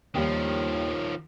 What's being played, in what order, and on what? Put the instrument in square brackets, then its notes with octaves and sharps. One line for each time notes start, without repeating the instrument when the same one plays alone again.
[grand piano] D#2 G3 [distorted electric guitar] D#3 F3 [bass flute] C#5